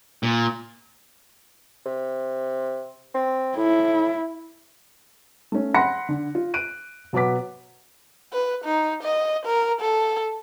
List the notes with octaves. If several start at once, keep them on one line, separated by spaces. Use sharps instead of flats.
A#2
C3
C4
A2 E4
A3 C#4
F#5 B5 C6 F#6 A#6 C#7
D3
F4
F#6 D7 D#7
B2 F#3 B3 F#5 D6 B6
B4
D#4
D#5
A#4
A4